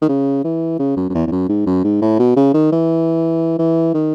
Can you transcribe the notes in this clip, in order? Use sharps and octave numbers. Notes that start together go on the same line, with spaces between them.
D#3
C#3
E3
C#3
F#2
F#2
E2
E2
F#2
G#2
F#2
G#2
A2
B2
C#3
D#3
E3
E3
D#3